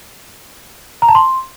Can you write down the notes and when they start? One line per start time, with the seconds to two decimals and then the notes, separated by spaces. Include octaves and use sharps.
1.02 A#5
1.09 A5
1.15 C6